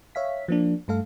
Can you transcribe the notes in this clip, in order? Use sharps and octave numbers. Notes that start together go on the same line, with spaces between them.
C#5 E5 F5 B6
F3 A#3 D4
G2 A3 A4 F5